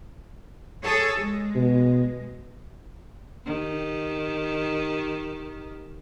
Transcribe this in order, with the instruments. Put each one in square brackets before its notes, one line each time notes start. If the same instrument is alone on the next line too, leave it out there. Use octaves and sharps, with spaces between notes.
[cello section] G#4 A4 C#5
G#3
[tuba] B2
[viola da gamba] D#3 G4